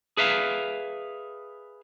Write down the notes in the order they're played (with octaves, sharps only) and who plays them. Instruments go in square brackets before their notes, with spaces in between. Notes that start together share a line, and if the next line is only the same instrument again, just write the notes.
[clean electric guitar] G#4 B4 E5 F5